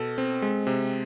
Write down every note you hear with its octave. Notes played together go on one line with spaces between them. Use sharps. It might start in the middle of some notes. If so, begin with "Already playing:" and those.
Already playing: B2 A4
C4
G#3
C3